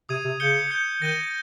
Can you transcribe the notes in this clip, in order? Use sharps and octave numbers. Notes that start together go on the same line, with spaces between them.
C3 D#6 G#6 D#7
C3
C#3 G6 C#7 G7
G6 C#7 G7
D#3 G6 A#6 D#7 G7